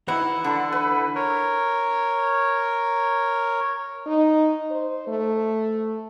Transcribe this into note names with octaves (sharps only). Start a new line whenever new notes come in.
E3 D#4 E4 F#5
D3 A4 B5
B4
A#4 C#5
D#4
C5
A3